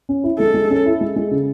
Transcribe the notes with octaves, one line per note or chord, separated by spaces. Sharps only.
C#4
E4
G#3 A4
G#3
C#4
E4
G#3
G#3
C#3